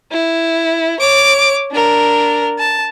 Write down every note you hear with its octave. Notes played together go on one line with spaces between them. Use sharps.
E4
C#5 D6
D4 A#4
A5